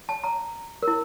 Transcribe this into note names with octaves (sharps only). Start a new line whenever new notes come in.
A5
A#5
A#4
E4